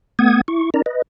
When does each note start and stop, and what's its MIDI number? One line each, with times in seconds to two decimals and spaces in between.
0.19 0.41 57
0.19 0.41 59
0.19 0.41 78
0.19 0.41 87
0.19 0.41 92
0.48 0.70 64
0.48 0.70 85
0.74 0.82 61
0.74 0.82 63
0.74 0.82 70
0.74 0.82 74
0.74 0.82 82
0.86 1.02 71
0.86 1.02 75